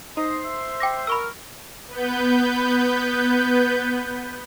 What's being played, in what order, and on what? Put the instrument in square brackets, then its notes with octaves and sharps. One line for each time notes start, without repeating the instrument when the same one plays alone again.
[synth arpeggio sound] D#4 [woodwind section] C5 C6 [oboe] D#5
[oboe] E5
[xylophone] G5 D6 A#6
[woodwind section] A#4 [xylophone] B5 C#6 E6
[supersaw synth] B3 B4 G6